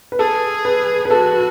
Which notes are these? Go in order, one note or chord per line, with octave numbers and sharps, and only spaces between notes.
B4
G#4 A4
B4
B4
F#4 A4